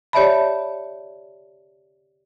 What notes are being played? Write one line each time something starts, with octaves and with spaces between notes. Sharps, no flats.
G4 C#5 D5 E5 A5 B5